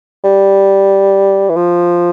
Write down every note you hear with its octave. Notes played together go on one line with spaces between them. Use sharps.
G3
E3
F3